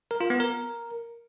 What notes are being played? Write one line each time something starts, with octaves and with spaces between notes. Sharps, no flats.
A#4
F4
B3
A#4